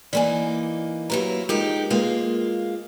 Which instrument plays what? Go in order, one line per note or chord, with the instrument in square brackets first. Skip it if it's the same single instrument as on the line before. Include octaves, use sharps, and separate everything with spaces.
[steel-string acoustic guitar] E3 A#3 D#4 [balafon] D5 G#5
[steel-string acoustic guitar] F#3 A#3 E4 [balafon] G4 B4 A#5
[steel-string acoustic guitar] G#3 D#4 G4 [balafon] F4 A#4
[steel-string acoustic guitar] G#3 A#3 F4 [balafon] A#4 B4